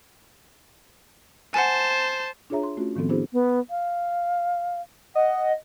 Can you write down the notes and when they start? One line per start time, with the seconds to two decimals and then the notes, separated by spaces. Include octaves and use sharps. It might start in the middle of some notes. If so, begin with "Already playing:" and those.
1.54 C5 F#5 G#5 A5
2.50 D4 F4 G#4 C#5 E5 A#5
2.63 C6
2.77 A3 C#4 F4 F#4
2.96 A2 D#3 F3 B3 C4 A4
3.09 B3 D4 E4 F#4 G#4 C5
3.33 B3
3.70 F5
5.15 D#5 F#5